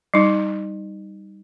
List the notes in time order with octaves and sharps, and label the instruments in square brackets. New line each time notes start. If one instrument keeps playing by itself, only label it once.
[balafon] G3 D#4